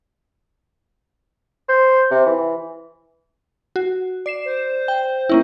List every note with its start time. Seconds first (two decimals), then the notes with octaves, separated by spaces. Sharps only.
1.69 C5
2.11 C3
2.26 E3
3.76 F#4
4.26 D5 C7 E7
4.45 C5
4.88 G5
5.29 A#3 C#4 E4